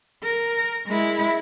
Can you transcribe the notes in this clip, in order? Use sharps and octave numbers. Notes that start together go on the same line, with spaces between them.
A#4
G#3 E4